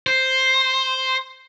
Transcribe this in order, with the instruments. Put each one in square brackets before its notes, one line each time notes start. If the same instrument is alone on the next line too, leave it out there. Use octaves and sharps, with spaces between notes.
[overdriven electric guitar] C5